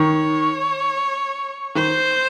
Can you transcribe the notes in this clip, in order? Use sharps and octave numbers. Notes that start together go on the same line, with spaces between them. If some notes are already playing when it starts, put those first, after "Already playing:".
Already playing: D#3 C#5
D#3 C5